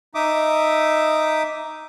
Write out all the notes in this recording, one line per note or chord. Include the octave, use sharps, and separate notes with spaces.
D#4 E5 D6 D#6